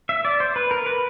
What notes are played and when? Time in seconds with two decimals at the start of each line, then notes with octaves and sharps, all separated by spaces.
0.09 E5
0.25 D5
0.40 C5
0.56 B4
0.71 A#4
0.86 B4